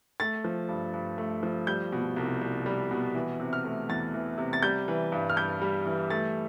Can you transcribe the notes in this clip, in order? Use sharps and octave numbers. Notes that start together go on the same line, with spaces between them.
A3 A6
F3
G2
G2
A3
F3
G3 G6
B2
C2
C2
G3
B2
E3
C3
F6
A3
E2 A6
E3
C3
A6
G3 G6
E3
G2
F6
G2 G6
G3
E3
A3 A6